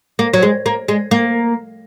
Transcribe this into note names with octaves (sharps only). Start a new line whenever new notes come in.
A#3
F#3
G#3
A#3
G#3
A#3